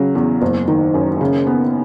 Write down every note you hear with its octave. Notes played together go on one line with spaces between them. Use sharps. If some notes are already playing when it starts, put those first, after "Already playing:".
Already playing: C#3 F#3
E2
F#1
D#3
F#2
C#3
B3